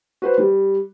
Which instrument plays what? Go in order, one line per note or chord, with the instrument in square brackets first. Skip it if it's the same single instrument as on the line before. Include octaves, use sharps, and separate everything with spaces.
[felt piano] F#4 B4 C5
G3